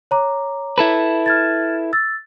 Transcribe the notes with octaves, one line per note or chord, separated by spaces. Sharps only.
C#5 A#5 D6
E4 A4 B4
F6 G#6 A6
E6 A6